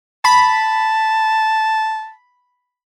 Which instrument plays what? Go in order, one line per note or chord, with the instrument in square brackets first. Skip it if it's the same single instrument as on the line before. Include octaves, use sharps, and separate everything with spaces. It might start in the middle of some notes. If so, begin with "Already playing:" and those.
[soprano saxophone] A5 [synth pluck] B5